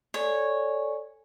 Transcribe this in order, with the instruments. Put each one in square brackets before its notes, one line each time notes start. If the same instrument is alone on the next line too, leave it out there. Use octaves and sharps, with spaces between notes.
[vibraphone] A4 D5 G#5 [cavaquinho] C#5